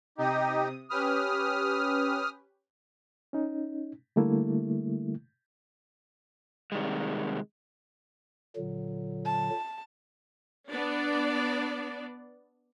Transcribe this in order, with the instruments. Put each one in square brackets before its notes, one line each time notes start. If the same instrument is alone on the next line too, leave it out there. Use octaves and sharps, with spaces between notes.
[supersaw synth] C3 D#6 [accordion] D#4 G4
[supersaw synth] C#4 G4 B4 [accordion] D#6 F6
[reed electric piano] C#4 D#4
D3 G3 A3 A#3 E4
[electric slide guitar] C3 D#3 G3 G#3
[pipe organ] A#2 D3 F#3
[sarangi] A5
[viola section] B3 D4 D5